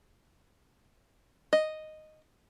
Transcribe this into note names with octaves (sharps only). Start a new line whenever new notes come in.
D#5